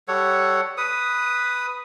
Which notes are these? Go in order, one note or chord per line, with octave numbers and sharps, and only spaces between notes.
G3 A4 C#5 F#5
B4 D#6